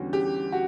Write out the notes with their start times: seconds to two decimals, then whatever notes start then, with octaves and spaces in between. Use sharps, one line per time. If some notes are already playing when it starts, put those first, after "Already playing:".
Already playing: E2 D3 G3 C#4 F#4
0.13 G4
0.52 F#4